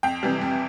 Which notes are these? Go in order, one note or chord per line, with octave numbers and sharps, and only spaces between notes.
F2 G5
C3 E3 G3
F2